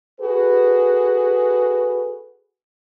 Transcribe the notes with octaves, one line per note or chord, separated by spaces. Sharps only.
F#4 G#4 A4 B4